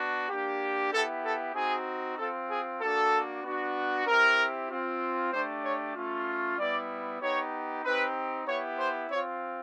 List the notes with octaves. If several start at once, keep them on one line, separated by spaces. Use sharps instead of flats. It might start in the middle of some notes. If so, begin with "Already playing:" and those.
Already playing: B3 D4 F#4
A#3 D4 G4
B3 E4 G4 A4
A4
C4 D#4 F#4 G#4
C4 F4 A4
G#4
A#3 D4 F#4 A4
B3 D4 F#4
C4 E4 G4 A#4
C4 F4
A3 D4 G4 C5
C#5
A3 C#4 F4
G3 B3 E4 D5
B3 D#4 G4 C#5
C4 D#4 G4 B4
B3 E4 G4 C#5
C5
C4 F4 C#5